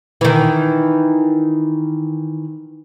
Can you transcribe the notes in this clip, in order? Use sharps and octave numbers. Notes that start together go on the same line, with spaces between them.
D#3 E3